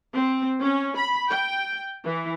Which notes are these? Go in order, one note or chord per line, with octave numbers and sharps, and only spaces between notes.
C4
C#4
B5
G5
E3